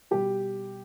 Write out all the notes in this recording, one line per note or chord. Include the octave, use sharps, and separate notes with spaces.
B2 G3 G4